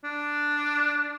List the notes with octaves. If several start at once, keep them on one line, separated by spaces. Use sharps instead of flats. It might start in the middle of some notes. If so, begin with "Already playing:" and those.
D4